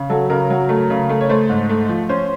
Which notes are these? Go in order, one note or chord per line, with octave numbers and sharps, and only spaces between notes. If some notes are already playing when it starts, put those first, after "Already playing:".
Already playing: C#3
F#3 A4
C#3 A#4
F#3
A3
C#3
A3
C#5
A3 C5
G#2
A3
F3
C#4 C5